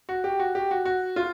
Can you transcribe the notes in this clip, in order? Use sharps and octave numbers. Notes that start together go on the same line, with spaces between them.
F#4
G4
F#4
G4
F#4
F#4
F4